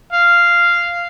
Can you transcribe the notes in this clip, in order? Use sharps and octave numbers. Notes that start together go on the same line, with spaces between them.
F5